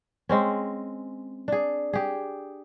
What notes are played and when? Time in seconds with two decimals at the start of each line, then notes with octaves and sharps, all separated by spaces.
0.29 G#3 C4 C#4
1.48 D4 G#4
1.93 G4 G#4